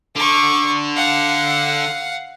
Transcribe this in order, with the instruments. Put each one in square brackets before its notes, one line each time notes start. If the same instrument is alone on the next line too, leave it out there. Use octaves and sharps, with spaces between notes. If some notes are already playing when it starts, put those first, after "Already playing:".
[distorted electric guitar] D3 [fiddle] C#6 D6
[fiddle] F5 F#5